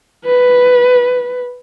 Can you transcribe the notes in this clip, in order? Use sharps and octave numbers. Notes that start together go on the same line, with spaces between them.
B4